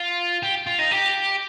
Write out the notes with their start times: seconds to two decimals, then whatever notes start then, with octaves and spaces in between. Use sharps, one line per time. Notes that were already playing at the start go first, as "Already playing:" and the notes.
Already playing: F4
0.43 G4
0.67 F4
0.79 D#4
0.91 G4